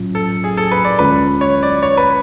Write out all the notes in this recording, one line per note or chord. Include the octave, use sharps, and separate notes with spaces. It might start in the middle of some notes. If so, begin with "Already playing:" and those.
Already playing: A2 F#3 C#4 F4
A4
G#4
A4
B4
D5
D2 D3 G#3 C#4 F4 B4
C#5
D5
C#5
B4